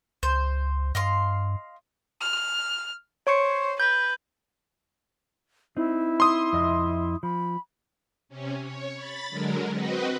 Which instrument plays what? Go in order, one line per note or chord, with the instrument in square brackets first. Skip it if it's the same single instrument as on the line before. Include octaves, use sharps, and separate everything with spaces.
[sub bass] C#2 [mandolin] C5
[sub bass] G2 [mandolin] D#5 F5 C6
[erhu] F6
[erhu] C5 [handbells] C#5 C#6 C#7
[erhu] B4 [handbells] G6
[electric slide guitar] C4 D#4 [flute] E4
[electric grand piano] C6 D#6
[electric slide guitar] F2 D#5 E5
[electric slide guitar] F3 [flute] B5
[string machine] C3 C#4
C#5
B5 A6
D3 F#3 G#3 A#4
C4 F#4 B4 D#5